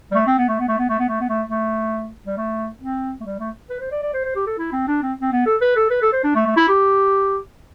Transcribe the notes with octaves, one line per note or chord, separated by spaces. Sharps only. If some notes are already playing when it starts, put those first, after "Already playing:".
G3
A3
C4
B3
A3
B3
A3
B3
A3
B3
A3
B3
A3
A3
G3
A3
C4
A3
G3
A3
B4
C5
D5
D5
C5
C5
G4
A4
E4
C4
D4
C4
C4
B3
A4
B4
A4
B4
A4
C5
D4
A3
A3
E4
G4